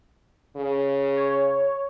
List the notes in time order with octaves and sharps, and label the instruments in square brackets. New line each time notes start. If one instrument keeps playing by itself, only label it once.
[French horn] C#3
[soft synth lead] C#5